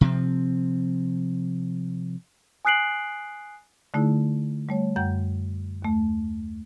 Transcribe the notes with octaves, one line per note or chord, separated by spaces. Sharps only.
C3 F3 C4
G#5 D#6 F#6 C7 D7 F#7
D3 A3 D#4 E4 G#4
G3 A3 C#5
F#2 F#5 G5 G6
D#2 A3